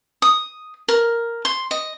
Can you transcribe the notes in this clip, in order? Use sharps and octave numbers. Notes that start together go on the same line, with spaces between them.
D#6
A#4
C6
D#5